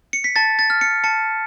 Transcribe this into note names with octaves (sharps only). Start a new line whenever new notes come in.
C#7
B6
A5 A6
A6
F6
C#7
A5 C#7